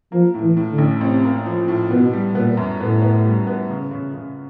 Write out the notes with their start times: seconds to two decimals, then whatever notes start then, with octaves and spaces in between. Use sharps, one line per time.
0.11 F3 A#3
0.34 A2
0.41 E3
0.57 A2
0.71 D3
0.78 A1
1.01 A1 C3
1.24 A#3
1.46 F3
1.68 A2
1.90 B2 B3
2.13 G3
2.35 A#2 B3
2.57 F#2
2.80 A2 B3
3.02 B3
3.25 G3
3.47 B3
3.70 C#3
3.91 C#3
4.14 C#3